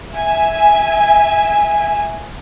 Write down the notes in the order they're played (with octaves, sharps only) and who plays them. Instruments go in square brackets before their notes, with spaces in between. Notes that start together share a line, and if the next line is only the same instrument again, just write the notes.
[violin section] E5 G#5